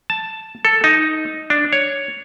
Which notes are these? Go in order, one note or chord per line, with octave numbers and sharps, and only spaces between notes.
A5
A4
D#4
D4
C#5